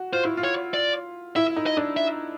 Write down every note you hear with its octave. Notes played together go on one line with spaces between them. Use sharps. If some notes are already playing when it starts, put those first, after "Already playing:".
Already playing: F#4
F4 C5
E4
F4
C#5
D5
E4 E5
D#4
D#5
D4
E5